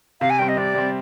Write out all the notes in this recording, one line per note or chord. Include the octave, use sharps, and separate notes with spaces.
C3 F5
G#5
G3 C4 G5
D#5
C3 D5
G3 C4